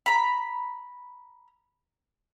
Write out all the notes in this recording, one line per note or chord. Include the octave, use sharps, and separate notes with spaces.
A#5 B5